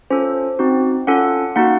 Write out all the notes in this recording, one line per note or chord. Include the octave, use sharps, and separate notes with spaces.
C#4 F4 A4 C5
C4 D#4 F#4
C#4 F4 A4 F#5
A#3 D#4 F#4 F#5